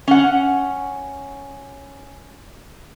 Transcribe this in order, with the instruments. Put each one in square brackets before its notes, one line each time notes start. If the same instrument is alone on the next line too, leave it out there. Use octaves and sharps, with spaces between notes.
[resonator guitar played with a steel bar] C#4 F#5